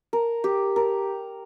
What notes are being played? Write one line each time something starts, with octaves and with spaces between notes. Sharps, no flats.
A#4
G4
A#4